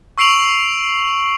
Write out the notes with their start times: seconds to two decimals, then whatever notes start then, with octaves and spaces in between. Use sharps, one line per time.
0.18 C#6 E6 C7 D7 F7 F#7